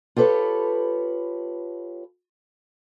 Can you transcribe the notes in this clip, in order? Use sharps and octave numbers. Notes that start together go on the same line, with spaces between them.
F4 G4 A4 B4 C#5